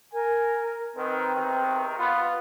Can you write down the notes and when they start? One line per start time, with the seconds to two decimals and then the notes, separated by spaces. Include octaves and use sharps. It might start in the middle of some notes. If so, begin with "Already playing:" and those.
0.14 A#4 G#5
0.96 D#3 C4 B4
1.34 E2 C3 D#3
1.98 B3 F4